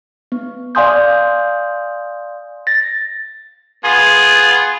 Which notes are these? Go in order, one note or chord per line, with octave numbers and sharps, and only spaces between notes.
B3
D5 F5 G#5 C6 D#6 G6
A6 A#6
B3 F4 G#4